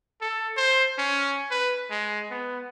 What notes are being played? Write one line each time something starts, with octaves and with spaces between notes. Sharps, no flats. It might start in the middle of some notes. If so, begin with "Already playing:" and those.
A4
C5
C#4
B4
G#3
B3